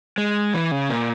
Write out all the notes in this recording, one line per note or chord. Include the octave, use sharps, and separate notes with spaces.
G#3
E3
C#3
A#2